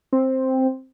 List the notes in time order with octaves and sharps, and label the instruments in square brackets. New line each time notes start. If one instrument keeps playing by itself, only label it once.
[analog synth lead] C4